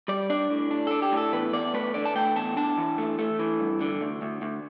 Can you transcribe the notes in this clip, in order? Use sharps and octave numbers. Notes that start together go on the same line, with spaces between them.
G3 D5
D4 D5
A2
D4
D4 A4
G4
A2
A4
E2 B4
E2 D5
A3 B4
D3 D5
A5
A3 G5
E2 A5
D4 A5
E3
A3
A3
E3
G2
D3
D2
D2
D2